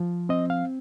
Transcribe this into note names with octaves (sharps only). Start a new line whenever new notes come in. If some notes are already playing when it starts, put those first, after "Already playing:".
Already playing: F3
C4 D#5
F5